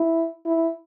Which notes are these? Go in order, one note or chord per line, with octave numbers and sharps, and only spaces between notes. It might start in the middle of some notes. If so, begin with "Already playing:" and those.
Already playing: E4
E4